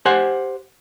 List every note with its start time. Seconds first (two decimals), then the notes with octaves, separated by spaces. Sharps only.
0.05 G4 C5 F#5 G#5